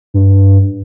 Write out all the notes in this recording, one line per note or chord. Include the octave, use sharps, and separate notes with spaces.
G2